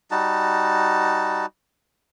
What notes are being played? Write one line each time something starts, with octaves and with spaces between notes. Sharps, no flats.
G3 D#4 F#4 A5